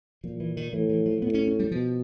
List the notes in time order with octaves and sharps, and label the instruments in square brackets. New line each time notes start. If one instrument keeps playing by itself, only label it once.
[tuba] A#2 [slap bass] F3
[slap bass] E3
D#3
[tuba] A2 [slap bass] E3
[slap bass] E3
F3
[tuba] A2 [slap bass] B3
[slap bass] C#4
C#4
G3
[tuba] B2 [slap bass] F3